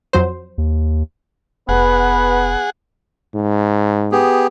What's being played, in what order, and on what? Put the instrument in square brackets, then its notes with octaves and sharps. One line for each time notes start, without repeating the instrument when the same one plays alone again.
[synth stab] F2 F#3 C5
[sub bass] D#2
[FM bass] F1 [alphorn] B3 [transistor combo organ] G#4 F#5 [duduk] B4
[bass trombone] G#2
[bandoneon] B3 G4 G#4